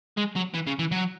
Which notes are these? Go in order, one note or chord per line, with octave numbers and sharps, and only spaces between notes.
G#3
F#3
E3
C#3
E3
F#3